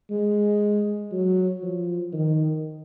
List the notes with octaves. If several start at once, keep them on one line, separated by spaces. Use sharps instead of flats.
G#3
F#3
F3
D#3